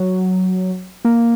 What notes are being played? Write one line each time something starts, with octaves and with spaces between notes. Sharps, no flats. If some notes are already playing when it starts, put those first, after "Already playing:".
Already playing: F#3
A#3